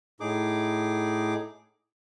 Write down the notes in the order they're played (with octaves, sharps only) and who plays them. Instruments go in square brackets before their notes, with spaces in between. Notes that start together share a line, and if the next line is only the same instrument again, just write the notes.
[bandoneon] A2 D#4 G#4 D6